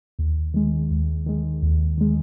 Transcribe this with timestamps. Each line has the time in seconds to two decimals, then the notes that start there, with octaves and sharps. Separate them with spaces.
0.19 D#2
0.54 D#3 G#3
0.91 D#2
1.26 D#3 G#3
1.63 D#2
1.98 D#3 G#3